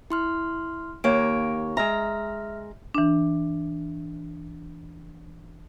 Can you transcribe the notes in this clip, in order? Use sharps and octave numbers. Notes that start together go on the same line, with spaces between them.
E4 C6 F6
D#2 A#3 C#5 D7
G#3 E5 A#5 F6
E3 D4